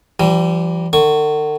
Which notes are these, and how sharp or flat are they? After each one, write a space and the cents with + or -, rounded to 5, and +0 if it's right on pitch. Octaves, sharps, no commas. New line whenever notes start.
E3 +45 G3 -25
D3 +45 C#6 +0